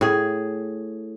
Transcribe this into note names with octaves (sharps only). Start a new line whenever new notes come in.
A2 G#4